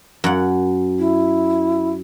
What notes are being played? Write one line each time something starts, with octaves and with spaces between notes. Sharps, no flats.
F#2 F#5
E4